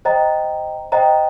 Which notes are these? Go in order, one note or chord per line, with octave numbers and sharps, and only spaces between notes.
C5 D#5 G5 A#5
C5 D#5 G5 A#5